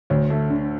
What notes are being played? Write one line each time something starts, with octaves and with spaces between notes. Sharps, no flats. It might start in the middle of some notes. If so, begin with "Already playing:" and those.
D2 C#5
A3
D3